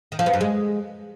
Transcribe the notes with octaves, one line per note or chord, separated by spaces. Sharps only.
D#3
F3
B3
F#2
G#3